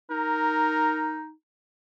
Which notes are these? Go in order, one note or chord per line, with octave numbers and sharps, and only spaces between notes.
D#4 A#4